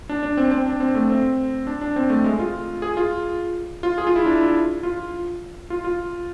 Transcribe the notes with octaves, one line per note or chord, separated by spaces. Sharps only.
D4
D4
C4
C4
D4
C4
A3
C4
D4
D4
C4
A3
G#3
F4
G#4
F4
F4
G#4
F4
E4
D4
E4
F4
F4
F4